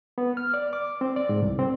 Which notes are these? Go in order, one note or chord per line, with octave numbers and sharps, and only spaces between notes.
B3
F6
D5
D6
C4
D5
G#2
C2
C4